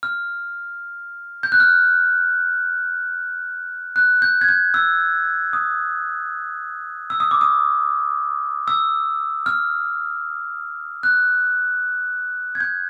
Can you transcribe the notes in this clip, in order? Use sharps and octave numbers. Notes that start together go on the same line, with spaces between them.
F6
G6
F#6
F6
F#6
G6
G#6
G6
E6
D#6
E6
D#6
D6
D#6
E6
F6
F#6
G#6
G6